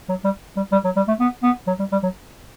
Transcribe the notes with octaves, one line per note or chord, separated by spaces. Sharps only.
F#3
G3
G3
G3
F#3
G3
A3
B3
B3
F#3
G3
G3
F#3